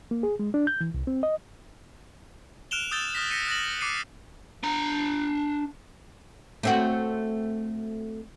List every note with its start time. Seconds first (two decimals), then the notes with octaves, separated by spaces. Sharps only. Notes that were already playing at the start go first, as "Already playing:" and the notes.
0.11 A#3
0.23 G#4
0.40 G#3
0.54 D4
0.67 G6
0.81 E3
0.94 C2
1.07 C4
1.23 D#5
2.71 F6 F#6 D7 E7 F7 G7
2.91 D#6 E6 F#6 G6 A6 G7
3.15 D#6 F6 A#6 B6
3.30 A#6 B6 C#7 D#7
3.47 F#6 A6 A#6 F#7
3.80 D6 F#6 C7 C#7 D#7
4.64 D4 A#5
6.63 A3 C4 F#4